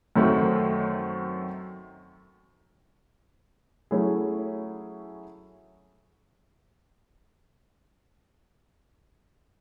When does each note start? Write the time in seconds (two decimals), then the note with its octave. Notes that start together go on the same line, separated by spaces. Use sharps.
0.16 F#2 D#3 F#3 A3 C4
3.91 F#3 A3 C#4 E4 G#4